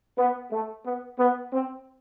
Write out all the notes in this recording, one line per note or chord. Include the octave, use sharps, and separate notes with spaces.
B3
A3
B3
B3
C4